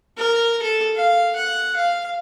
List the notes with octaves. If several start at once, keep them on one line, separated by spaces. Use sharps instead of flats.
A#4
A4
F5
F#5
F5